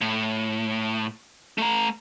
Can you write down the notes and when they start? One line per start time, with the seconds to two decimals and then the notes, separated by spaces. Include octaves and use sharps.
0.01 A2
1.58 A3 A#5